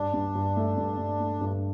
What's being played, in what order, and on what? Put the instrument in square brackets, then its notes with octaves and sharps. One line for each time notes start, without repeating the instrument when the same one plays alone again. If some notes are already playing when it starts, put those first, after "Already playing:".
Already playing: [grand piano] G2 [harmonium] D4
[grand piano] G2
G2
A3
G2
G2
A3
G2